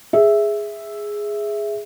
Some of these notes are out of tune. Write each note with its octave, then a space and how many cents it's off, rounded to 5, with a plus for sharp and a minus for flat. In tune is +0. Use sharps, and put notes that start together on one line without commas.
G#4 +0 E5 +0